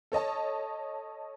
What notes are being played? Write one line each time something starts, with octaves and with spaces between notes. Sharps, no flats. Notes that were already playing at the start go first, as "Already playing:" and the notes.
A4 C#5 D#5 A5